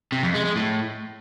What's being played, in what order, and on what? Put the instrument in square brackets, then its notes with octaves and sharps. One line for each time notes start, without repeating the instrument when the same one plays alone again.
[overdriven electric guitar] C3
F2
G#3
G#3
A2